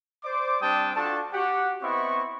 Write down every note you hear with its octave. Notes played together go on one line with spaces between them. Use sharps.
C5 D5 D6
G3 C4 D4 G5 A5 D#6
D4 F4 F#4 A4 A5
F#4 G4 F#5
B3 C4 E4 D#5 C#6